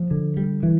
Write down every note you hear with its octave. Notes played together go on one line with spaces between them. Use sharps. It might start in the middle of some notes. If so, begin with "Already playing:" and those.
Already playing: F3
D3
G3
E3